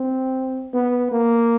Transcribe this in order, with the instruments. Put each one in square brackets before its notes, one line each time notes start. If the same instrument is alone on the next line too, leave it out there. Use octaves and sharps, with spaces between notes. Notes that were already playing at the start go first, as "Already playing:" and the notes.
Already playing: [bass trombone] C4
B3
A#3